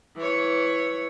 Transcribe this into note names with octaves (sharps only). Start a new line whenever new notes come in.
E3 C#5